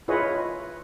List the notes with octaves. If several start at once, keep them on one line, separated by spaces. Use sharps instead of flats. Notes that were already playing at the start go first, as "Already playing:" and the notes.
E4 F4 G#4 B4 C#5 D#5